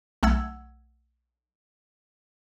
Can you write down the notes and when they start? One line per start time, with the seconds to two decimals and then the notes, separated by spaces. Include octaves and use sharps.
0.23 B1 A3 F#5 E6 G#6